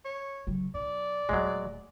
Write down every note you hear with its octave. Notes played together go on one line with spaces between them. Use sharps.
C#5
C#3 F#3
B1 D5
D#1 F#3 G#3 A3